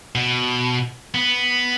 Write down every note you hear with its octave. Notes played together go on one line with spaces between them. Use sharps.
B2
B3